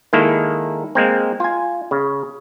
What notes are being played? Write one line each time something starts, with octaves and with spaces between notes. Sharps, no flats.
D#3 G#3 A#3 E4 A4
G#3 A#3 C4
F4 G#5
C#3